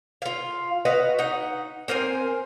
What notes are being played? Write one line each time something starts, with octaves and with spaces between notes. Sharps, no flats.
F4 F5
F#4 B4 D#5 F5
D#4 F#5
C4 A#4 C5 G#5